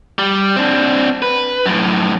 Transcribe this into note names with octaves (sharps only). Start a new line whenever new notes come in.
G3
C4 D4
B4
F#2 A2